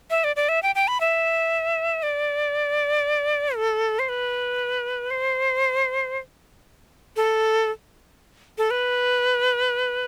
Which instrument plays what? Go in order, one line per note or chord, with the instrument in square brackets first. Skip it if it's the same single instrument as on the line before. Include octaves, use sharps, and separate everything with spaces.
[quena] E5
D5
D5
E5
G5
G5
B5
E5
D5
A4
C5
B4
C5
A4
A4
B4